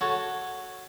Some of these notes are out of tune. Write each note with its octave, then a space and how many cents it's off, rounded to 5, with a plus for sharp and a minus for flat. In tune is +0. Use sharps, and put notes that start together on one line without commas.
F#4 -5 A4 +0 C#5 +0